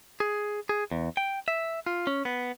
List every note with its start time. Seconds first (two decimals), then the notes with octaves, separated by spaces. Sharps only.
0.20 G#4
0.69 G#4
0.91 E2
1.17 G5
1.48 E5
1.86 F4
2.07 C#4
2.25 B3